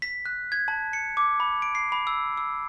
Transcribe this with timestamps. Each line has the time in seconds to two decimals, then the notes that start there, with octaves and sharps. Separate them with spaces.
0.02 B6
0.25 F#6
0.52 G#6
0.68 A5
0.93 C#7
1.17 D6
1.40 B5
1.62 D7
1.75 C7
1.92 B5
2.07 E6
2.37 E6